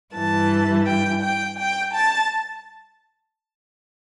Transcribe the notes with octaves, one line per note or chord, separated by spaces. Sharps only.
G2 E3 A5
G5
G5
G5
A5